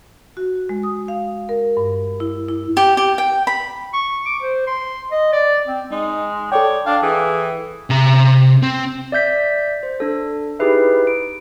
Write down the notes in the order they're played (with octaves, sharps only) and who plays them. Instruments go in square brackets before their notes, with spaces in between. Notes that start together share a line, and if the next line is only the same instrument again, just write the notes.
[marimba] F#4
G#3
D#6
F5
A#4
G2
E4
E4
[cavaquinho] G4
G4
G5
B5
[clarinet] C#6
D6
C5
C6
D#5
D5
C4
[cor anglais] G#3 [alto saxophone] D#4
[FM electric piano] A4 G5 [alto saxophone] C#5 [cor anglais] D5
[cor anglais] D4 [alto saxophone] F5
[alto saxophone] E3 [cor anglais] G#4
[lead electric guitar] C3 A#5
C4
[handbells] D5 E5 G6 B6
C5
D4 A4
D#4 E4 G4 G#4 B4 E5
D7